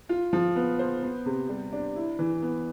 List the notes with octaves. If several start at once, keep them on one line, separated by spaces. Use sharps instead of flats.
F4
F3
B3
C5
B3
C3
G3
D4
E4
E3
B3